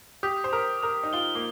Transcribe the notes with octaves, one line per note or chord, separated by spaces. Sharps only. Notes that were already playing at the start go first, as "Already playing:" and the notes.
G4 D#6
C5
A#4 D#6
A#4 D#6
D#4
F4 G7
A#3